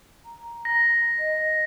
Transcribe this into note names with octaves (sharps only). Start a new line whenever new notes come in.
A#5
A#6
D#5